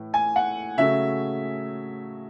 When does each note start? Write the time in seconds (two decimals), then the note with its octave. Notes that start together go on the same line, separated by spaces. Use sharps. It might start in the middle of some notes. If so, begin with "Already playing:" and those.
Already playing: A2 E3 A3
0.14 G#5
0.36 F#5
0.77 C#3 F#3 A3 E5